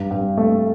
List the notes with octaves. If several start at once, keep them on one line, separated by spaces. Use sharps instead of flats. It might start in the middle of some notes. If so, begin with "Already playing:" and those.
Already playing: G2
G2
A3